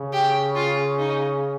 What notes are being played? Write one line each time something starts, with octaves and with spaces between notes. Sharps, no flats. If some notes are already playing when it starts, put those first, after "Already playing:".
Already playing: C#3
G4
F4
D#4